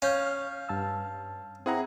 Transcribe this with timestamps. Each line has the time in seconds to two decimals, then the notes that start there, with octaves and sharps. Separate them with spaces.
0.02 C#4 F5 F6 G6
0.69 G2 A5 E6
1.66 C4 E4 G#4 F#5 A#5